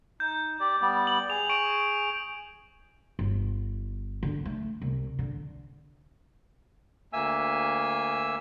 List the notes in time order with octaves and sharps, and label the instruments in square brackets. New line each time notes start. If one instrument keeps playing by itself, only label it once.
[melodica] D#4 [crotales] G6
[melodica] G4 D5
G3 B3 D5
[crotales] F#7
[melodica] G#4 [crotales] F7
[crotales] C#6 D7
[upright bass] G1
D3
A3
C2
D3
[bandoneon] D2 A#3 E5 G#5 E6